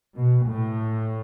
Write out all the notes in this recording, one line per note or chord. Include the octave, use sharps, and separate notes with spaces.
B2
A2